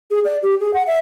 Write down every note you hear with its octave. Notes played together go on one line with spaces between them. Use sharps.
G#4
D5
G4
G#4
F#5
E5